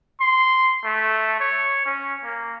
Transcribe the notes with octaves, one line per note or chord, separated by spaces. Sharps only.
C6
A3
C#5
C#4
A#3